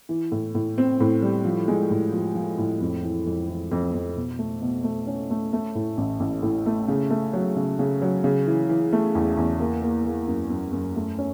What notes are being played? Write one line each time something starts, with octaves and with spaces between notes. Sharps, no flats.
E3
A2
A2
C4
A2
G3
F3
G#3
A2
F3
F3
A2
F2
E3
F2
E3
F2
F2
B2
A3
B2
A3
C#4
A3
A3
A2
A1
A1
A2
A3
C#3
A3
F#3
C#3
C#3
F#3
C#3
E3
E3
A3
E2
E2
A#3
A#3
A#3
F#2
F#2
F#2
A3
C#4